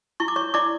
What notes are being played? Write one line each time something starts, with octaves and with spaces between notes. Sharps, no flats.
E4 C#6
D6
C#5 C#6
E4 D5 D6